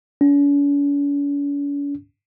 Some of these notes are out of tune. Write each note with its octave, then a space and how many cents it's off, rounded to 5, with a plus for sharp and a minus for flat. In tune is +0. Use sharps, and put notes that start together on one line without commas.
C#4 +45